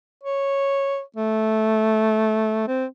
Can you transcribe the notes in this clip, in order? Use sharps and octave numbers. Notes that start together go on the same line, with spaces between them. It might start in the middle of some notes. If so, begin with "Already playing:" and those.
C#5
A3
C4